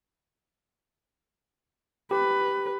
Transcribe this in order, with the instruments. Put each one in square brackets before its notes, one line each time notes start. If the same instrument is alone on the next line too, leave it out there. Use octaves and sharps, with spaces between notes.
[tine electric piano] G4 [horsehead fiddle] B4